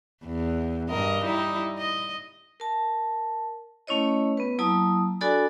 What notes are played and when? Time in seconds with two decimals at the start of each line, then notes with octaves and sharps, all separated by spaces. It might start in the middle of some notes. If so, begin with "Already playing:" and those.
0.24 E2
0.90 G2 A#4 D#5
1.24 G3 D#4 E4
1.79 D#5
2.60 A#4 A5
3.87 A3 C#4 E4 C#5 D#5
4.37 B3 B4
4.59 F#3 A#3 E4 A5 A#5 D#6
5.21 D4 F#4 A4 D5 G#5 B5